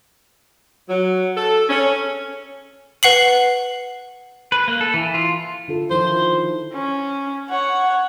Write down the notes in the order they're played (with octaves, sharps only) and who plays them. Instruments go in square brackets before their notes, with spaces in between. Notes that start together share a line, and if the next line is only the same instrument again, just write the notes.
[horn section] F#3
A4
C#4
[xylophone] B4 F#5 C7 F#7
[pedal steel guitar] B4
A#3
A4
E3
F4
[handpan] D3 F4 A4
[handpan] D#3 F3 E4 [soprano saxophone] C5
[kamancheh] C#4
C#5 F#5